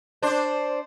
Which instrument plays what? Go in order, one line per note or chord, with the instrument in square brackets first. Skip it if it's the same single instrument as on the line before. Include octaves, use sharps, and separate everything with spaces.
[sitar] D4 C5